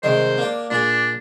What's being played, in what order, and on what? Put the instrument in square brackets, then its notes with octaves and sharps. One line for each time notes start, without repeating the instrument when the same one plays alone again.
[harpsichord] C2 D#3 G#3 [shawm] C5
[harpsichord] A#3 D4
[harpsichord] A#2 G#4 [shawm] D4